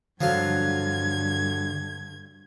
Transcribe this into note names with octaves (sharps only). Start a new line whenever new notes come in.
G2 D3 F3 F#3 F4 G#6